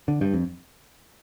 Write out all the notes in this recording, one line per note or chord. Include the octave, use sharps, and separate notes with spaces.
D3
G2
F2